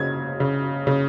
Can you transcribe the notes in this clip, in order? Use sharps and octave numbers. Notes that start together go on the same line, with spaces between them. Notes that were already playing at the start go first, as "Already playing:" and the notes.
Already playing: C#3 G#6
C#3
C#3